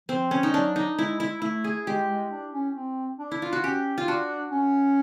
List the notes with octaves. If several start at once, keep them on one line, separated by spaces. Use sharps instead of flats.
F3 C4
C#4
G3 D#4
F#3 D4
D#4
G#3 E4
E4
A3 E4
G#4
G#3 G4
G#3
D4
C#4
C4
D4
E4
F4
F#4
C#4 G4
F4
D4 F#4
C#4